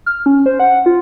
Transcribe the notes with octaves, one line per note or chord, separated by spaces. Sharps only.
F6
C#4
C5
F#5
F4